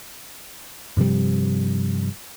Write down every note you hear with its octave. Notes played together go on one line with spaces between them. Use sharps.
G2 C3 F3 G3